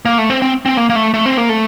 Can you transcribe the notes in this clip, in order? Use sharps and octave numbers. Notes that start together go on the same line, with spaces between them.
A#3
A3
C4
C4
C4
A#3
A#3
A3
A3
C4
A#3
A3